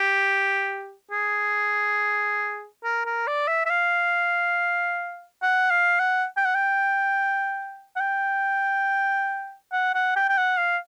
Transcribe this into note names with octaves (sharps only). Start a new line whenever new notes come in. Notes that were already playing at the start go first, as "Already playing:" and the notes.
Already playing: G4
G#4
A#4
A#4
D5
E5
E5
F5
F#5
F5
F#5
G5
F#5
G5
F#5
G5
F#5
F#5
G5
G5
F#5
F5